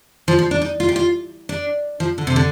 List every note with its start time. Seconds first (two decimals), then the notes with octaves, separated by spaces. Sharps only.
0.28 F3
0.39 F3
0.51 D4
0.62 D#4
0.80 F4
0.89 G4
0.96 F4
1.49 D4
2.00 F3
2.18 D3
2.27 C3
2.36 D3